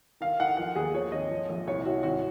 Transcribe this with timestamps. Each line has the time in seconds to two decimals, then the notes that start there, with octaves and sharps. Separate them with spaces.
0.21 D#3 F5
0.40 D#3 F#5
0.57 F3 F#5
0.76 D#2 G#4
0.93 F3 C#5
1.12 G#1 D#5
1.30 F3
1.49 A#1
1.67 C2 C#5
1.85 C2 F#4
2.03 G#1 F#4